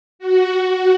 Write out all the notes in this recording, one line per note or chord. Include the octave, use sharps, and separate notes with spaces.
F#4
F#4